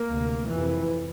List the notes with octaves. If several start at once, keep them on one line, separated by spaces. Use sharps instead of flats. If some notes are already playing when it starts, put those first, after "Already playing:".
Already playing: A#3
D2 C3
F2 C3 E3